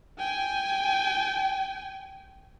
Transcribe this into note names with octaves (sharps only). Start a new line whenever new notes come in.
G5 G#5